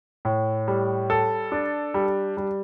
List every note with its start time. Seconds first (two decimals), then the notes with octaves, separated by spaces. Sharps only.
0.25 A2
0.68 G3
1.10 A4
1.52 D4
1.94 G3
2.37 G3